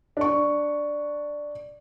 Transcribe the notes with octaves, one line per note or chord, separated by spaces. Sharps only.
D4 C#6